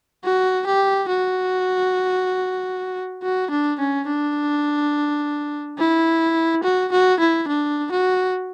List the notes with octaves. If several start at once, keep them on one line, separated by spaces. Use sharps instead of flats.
F#4
G4
F#4
F#4
D4
C#4
D4
E4
F#4
F#4
E4
D4
F#4